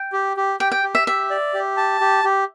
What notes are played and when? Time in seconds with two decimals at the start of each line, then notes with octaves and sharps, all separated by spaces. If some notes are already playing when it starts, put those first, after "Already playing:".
Already playing: G5
0.13 G4
0.37 G4
0.60 G4 G5
0.72 G5
0.84 G4
0.95 E5
1.07 G4 E5
1.30 D5
1.54 G4
1.77 A5
2.01 G4
2.24 G4